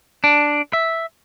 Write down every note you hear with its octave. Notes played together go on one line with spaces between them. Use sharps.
D4
E5